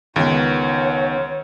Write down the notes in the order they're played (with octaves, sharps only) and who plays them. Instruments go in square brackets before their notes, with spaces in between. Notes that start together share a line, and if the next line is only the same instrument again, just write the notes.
[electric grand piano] C#2 [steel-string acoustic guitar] D#3 B3 [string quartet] C#5